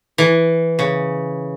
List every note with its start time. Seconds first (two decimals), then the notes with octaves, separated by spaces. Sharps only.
0.18 E3
0.79 C#3